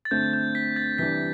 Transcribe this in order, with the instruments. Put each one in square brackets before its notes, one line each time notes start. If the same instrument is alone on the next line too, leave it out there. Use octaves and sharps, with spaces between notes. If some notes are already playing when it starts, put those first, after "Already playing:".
[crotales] A6
[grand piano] D3 A3 C4 [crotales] G6
[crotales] G6
B6
A6
[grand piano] C3 E3 G3 D4 [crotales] B6